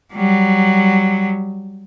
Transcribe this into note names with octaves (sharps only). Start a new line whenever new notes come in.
F#3 G3